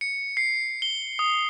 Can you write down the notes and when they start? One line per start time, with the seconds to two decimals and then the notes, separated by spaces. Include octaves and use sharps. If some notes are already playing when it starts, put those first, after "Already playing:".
0.01 C#7
0.37 C7
0.82 G7
1.19 D#6